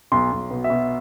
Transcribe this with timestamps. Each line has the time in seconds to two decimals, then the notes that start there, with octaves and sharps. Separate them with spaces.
0.12 B1 C6
0.32 B1
0.51 B2
0.64 E5
0.70 B2